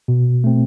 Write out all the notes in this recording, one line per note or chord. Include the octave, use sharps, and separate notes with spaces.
B2
A3 C4